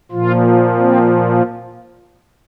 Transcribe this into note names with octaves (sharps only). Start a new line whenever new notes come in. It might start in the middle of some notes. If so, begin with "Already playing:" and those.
A#2 F3 F4
C4